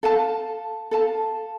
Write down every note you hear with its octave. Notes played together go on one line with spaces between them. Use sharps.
A4 F5 A5
A4 F5 A5